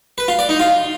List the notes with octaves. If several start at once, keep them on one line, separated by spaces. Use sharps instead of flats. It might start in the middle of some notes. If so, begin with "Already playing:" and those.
B4
F4
D5
D#4
F4